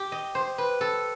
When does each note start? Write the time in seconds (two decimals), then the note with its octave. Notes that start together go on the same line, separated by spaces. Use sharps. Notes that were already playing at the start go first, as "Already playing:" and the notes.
Already playing: G4
0.12 D#5
0.35 C5
0.58 B4
0.81 A4